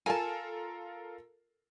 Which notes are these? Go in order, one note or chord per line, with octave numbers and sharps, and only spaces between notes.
F4 A4 A#4 G#5 A5